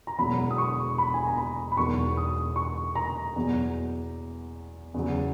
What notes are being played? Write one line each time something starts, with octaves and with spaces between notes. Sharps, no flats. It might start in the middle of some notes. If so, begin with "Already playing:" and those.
A#5
E1 E2 B2 F#3 B5
D#6
C#6
B5
G#5
A#5
B5
B5
E1 E2 D#3 F#3 C#6
D#6
C#6
A#5
E2 B2 F#3
E2 C#3 F#3